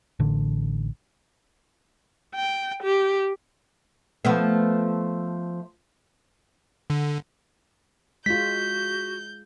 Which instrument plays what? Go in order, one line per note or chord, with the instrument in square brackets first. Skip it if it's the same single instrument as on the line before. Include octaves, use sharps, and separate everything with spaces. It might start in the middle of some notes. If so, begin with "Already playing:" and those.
[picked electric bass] A1 D3
[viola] G5
G4
[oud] F3 A3 B3
[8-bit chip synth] D3
[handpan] G#3 F4 [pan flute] F#4 [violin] G6 [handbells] B6